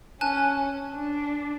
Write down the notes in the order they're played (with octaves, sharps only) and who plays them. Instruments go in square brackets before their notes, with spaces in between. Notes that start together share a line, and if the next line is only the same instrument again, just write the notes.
[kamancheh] C#4 [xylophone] G#5 A5 F#6
[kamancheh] D4